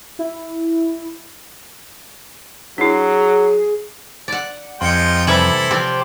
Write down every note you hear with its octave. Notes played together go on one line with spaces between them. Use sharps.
E4
F#3 D4 E4 G#4
D5 F#5
F2 G#3 F4 G5 C6 C#7
C3 E3 G3 E4 A4 D6 G#6 F#7
F3 C4 G4 C5 D5